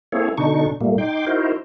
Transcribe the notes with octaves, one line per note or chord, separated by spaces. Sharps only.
A#3 C4 E4 G#4 A4 C#5
B2 D3 D4 D#4 C#6
A#2 G3 A3 A#3
D#4 G5 C6 D6
D#4 E4 F#4 A#4 C5